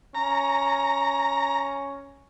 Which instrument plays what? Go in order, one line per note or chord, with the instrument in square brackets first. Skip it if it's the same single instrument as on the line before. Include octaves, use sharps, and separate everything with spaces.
[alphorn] C#4 [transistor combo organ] A#5